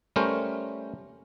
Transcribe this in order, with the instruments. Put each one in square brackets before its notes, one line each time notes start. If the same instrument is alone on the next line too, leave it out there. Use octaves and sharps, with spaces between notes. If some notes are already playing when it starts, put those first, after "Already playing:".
[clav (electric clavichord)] G3 A3 C#4 A#4 C5